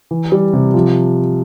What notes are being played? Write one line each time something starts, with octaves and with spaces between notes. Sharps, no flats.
E3
G3
C3
F3